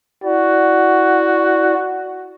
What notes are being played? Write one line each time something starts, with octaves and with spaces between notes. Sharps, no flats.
E4 F#4 D5